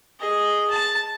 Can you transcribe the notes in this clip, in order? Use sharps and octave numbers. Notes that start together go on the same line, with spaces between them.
G#4 D#5
A5